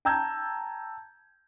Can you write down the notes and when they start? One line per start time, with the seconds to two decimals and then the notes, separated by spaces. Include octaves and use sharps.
0.05 G5 A5 A#5 E6 G6 G#6